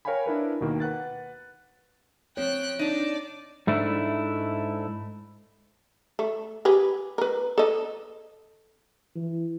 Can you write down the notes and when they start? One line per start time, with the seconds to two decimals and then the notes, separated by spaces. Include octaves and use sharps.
0.05 A#4 C#5 F5 G5 G#5 B5
0.26 D4 E4 A#4 B4
0.60 D#2 B2 D#3 A#3
0.80 B4 F#5 F#6 A6
2.37 F3 C4 C#5 G5 F#6
2.79 D4 D#4 D5
3.67 G#2 A3 D4 E4
6.19 A3
6.65 G4 G#4 B4
7.18 A#4 B4
7.58 A4 D#5
9.16 E3